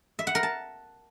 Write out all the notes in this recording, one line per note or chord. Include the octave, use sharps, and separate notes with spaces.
E5
F#5
A#4
A5